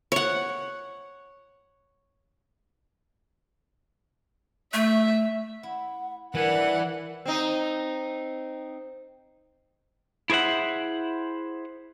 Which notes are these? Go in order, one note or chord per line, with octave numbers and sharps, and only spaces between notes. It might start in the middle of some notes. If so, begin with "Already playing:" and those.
C#5 F#5
A3 E5
E4 F#5
E3 G3 D4 A#4 F#5
C4 D#4
E4 G#4 C5 E5 F#5